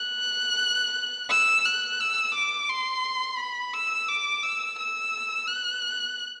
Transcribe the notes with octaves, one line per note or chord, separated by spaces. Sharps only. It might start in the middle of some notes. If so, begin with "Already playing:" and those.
Already playing: F#6
E6
F#6
E6
D6
C6
B5
E6
D6
E6
E6
F#6